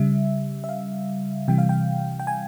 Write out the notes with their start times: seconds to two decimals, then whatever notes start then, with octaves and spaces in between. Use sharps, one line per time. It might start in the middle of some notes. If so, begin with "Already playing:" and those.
Already playing: C#3 G3 E5
0.64 E5
0.69 F5
1.48 C3 E3 G3 G5
1.58 F5
1.69 G5
2.20 G5
2.27 G#5